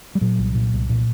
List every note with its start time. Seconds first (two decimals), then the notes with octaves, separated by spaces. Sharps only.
0.15 G3
0.21 A#2 F#3
0.38 C2
0.55 A#2
0.73 C2
0.89 A#2